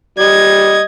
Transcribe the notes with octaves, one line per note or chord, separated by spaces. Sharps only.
G3 D#5 G#6